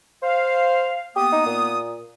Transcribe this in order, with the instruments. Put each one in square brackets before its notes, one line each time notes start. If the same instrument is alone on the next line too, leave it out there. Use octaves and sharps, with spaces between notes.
[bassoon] C5 [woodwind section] F5
[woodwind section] A#3 B3 D#6 [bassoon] G4
[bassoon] D#4
A#2